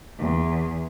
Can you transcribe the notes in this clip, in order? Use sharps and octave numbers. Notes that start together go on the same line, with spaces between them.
E2